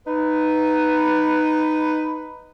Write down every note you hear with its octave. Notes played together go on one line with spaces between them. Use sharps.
D#4 B4